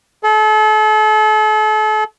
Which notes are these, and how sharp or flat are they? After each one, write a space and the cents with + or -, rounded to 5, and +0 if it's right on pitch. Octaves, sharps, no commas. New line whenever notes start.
A4 -40